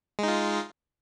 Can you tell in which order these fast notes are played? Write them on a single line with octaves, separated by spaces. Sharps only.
G#3 D#4 F4